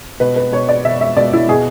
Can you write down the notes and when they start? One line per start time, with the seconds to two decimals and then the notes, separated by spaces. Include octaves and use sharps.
0.20 B2 B4
0.36 B4
0.52 B2 C#5
0.69 D5
0.85 B2 E5
1.01 E5
1.16 B2 D5
1.33 E4
1.49 B2 G#4